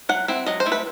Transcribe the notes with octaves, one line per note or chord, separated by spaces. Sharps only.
F#3 F#5
C4 E4
F#3 D#5
C5
A3 E4
B4